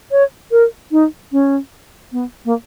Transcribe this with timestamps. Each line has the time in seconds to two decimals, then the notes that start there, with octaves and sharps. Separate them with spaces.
0.11 C#5
0.51 A#4
0.91 D#4
1.32 C#4
2.12 B3
2.45 A#3